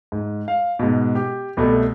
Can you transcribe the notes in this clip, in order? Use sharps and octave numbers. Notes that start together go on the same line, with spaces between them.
G#2
F5
G#2 B2
G4
C2 B2 A3